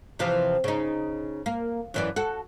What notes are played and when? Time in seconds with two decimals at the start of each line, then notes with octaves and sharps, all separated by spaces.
0.19 C3 E3 F3
0.64 C#3 D#4
1.46 A#3
1.94 F#2 E3 D5
2.16 F#4 A4